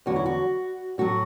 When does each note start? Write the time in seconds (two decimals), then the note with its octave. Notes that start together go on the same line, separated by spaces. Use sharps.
0.06 E2 D3 F#3 F#4
0.16 E4
0.26 F#4
0.98 A2 F#3 F#4